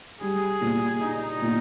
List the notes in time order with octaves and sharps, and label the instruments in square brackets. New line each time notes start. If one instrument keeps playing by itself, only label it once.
[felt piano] G3 [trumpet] G#4
[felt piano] A#2
[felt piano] D4 [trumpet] D#4
[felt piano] A#2